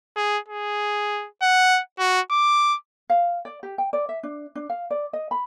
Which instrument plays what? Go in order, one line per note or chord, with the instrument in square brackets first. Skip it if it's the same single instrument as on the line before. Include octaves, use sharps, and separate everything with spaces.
[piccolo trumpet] G#4
G#4
F#5
F#4
D6
[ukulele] F5
D5
G4
G5
D5
E5
D4
D4
F5
D5
D#5
B5